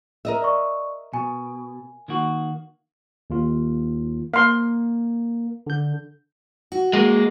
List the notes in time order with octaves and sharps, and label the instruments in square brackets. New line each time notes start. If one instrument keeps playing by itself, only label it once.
[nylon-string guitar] A#4 D#5 E5
[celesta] D5 C#6
[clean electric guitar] B2 [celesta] G#5
[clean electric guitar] D#3 A#3 F#4
[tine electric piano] D#2 F4
[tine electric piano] A#3 [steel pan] F5 C6
[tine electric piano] D3 G6
[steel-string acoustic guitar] F#4
[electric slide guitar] G#3 A#3